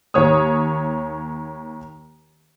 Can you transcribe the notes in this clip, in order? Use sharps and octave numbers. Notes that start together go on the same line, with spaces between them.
D#2 C#5 D#6